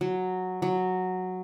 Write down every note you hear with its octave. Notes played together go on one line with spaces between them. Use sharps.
F#3
F#3